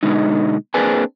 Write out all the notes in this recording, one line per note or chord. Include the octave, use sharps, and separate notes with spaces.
B2 D3 G#3 D#4
A#3 C4 D4 G#4 B4 G#5